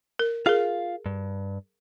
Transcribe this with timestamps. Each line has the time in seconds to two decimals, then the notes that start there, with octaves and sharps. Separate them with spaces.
0.19 A#4
0.46 F4 G#4 A#4 F5
1.06 G2